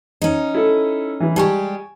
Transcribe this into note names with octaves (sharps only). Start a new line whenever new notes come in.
C#4 D#4
E4 A4
E3 E4
G3 G#3 G4 G#5 A5 C#6